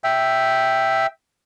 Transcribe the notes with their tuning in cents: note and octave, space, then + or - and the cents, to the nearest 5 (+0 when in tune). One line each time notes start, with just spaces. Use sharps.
E5 +0 G5 +0